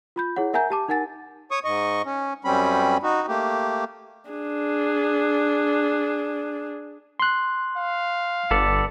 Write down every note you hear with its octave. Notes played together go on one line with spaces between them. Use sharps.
F4 B5 G6
E4 G#4 C#5 F#5
A#4 E5 F#5 G#5 A#5 G6
G4 A5 D6
D#4 A#4 F#5 G#5 A6
C#5 C#6 D#6
G#2 D#5 C#6
C#4
F#2 G3 C4 C#4 B5
D#4 F#4
A3 A#3 G4
D4 G#4
C6 F#6
F5
G1 B3 A4 D5